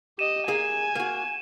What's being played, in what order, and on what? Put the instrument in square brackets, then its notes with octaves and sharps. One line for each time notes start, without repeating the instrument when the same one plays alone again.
[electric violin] G4 D#5 [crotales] D#7 E7
[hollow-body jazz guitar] A#3 G#4 [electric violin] G#5
[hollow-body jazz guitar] A#3 F#4